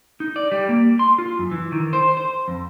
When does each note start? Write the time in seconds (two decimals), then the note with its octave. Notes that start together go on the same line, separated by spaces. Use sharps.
0.20 D#4
0.36 D5
0.52 G3
0.69 A#3
0.99 C6
1.18 F4
1.39 F#2
1.51 E3
1.72 D#3
1.93 C5
2.17 C5
2.48 F2